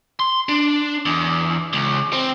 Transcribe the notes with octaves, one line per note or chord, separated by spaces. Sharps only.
C6
D4
E2
C#2
C4